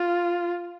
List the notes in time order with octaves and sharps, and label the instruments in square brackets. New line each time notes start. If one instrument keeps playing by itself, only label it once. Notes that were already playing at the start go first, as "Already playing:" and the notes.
Already playing: [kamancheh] F4